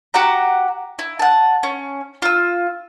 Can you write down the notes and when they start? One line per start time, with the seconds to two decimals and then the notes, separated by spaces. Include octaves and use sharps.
0.14 F#4 G4 F#5 A#5
0.99 E4
1.19 F#5 A5
1.63 C#4
2.22 F4 E6